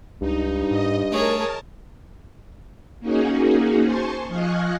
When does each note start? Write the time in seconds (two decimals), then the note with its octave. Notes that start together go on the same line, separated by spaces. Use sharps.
0.21 C#2 G2 D#4
0.71 G#2 D#5
1.12 A3 G#4 A#4 C#5 A5
3.00 A#3 C#4 D#4 F#4 G#4
3.83 C5 G#5 A5 C6 C#6
4.28 F3 D#5 F5 G#5 C#6 F#6